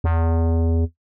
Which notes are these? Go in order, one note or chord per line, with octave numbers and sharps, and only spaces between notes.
E2